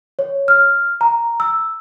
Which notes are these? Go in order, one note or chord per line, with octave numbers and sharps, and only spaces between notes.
C#5
F6
A#5
E6